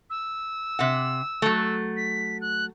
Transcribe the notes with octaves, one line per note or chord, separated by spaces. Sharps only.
E6
C3 F#5
F#3 A3
B6
F#6